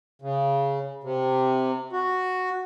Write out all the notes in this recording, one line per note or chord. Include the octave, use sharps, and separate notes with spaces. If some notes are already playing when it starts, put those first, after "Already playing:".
C#3
C3
F#4